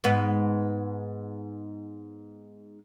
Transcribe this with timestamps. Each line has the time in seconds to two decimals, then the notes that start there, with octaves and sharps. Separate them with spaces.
0.04 G#2 B3